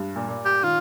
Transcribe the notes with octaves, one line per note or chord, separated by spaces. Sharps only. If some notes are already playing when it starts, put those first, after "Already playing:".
Already playing: G2
A#2
A#2
G4
D#3 F4